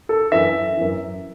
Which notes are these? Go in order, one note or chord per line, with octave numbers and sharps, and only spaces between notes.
A4
F#2 E3 E5
F#2 E3